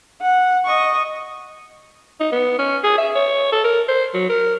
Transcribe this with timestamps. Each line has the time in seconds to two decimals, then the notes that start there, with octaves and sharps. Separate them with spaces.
0.22 F#5
0.65 D#5 C#6
2.20 D#4
2.32 B3
2.58 C#4
2.84 G#4
2.98 E5
3.15 C#5
3.52 A4
3.64 A#4
3.88 C5
4.14 F#3
4.29 A#4